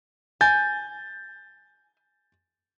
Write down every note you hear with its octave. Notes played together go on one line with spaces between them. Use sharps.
G#5 G6 A6